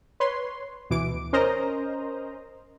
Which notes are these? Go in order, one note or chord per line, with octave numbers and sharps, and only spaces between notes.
B4 C#5 C6
D2 B2 E3 D6 D7
C#4 A#4 C5 D#5 A#5